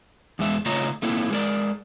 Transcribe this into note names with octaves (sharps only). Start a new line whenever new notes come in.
E2 G#3 E5
C#3 A3 F4 C#5 D#5 A#5
A3 A#3 C4 E4 G#4 A4
G#3 A#4 D5